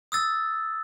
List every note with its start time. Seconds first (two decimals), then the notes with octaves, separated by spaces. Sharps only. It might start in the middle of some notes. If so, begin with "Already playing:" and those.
0.12 D#6 E6 A6